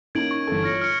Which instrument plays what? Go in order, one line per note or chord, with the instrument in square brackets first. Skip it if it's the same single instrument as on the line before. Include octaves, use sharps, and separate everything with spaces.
[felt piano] A#3 C#4 D#4 [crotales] G#6 D7 F#7
[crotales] C#6
[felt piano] G1 E3 A4
[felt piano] F4 C#5 [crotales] F6 A#6 C#7
[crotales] F6 C#7